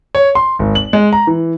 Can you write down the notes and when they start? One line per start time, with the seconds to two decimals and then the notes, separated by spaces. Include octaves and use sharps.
0.15 C#5
0.35 C6
0.59 G#1
0.75 F#7
0.93 G#3
1.13 A#5
1.27 E3